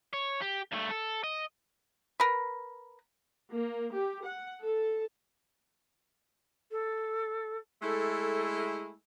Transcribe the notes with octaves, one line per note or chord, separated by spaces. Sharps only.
C#5
G4
G2 A3
A4
D#5
A#4 B4
A#3
G4
F#5
A4
A4
G#3 A3 E4 A4